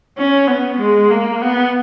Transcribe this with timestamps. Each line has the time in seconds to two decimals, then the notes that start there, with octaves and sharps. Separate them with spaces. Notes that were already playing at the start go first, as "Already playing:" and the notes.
0.18 C#4
0.48 B3
0.79 G#3
1.11 A#3
1.41 B3